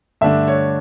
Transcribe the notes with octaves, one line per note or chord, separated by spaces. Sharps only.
G2 D3 A3 D4 E5
C#5